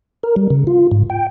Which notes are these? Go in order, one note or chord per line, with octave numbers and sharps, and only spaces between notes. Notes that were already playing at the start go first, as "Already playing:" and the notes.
A#4
G3
C#3
F4
G#2
G5